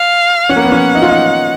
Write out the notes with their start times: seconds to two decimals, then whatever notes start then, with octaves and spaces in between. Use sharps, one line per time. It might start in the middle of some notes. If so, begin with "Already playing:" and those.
Already playing: F5
0.49 C#4 F#5
0.56 A#3
0.64 B3
0.72 C#4
0.95 D#4
1.02 F4
1.09 D#4